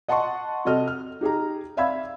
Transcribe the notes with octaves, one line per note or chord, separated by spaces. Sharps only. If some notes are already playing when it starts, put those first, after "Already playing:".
D#5 F#5 A5 C6 C#6
C3 F#4 A4 D#5 F6
F6
D#4 G4 G#4 A#5
D5 E5 F5 B5 E6 G#6